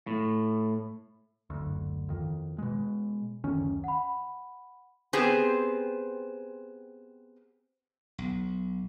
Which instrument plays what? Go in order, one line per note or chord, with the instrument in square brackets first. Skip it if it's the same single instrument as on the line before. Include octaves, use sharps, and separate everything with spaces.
[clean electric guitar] A2
[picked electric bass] F#1 D2
F2 D#3
B2 G#3
F#1 D2 D#3 C#4
[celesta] F#5 B5
[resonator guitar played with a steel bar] B3 C4 G4 G#4 C5
[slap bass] B1